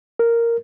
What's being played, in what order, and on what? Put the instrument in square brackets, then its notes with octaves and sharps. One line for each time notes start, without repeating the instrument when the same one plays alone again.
[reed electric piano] A#4